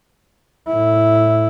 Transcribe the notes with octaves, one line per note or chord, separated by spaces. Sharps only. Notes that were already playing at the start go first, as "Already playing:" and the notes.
A2 E4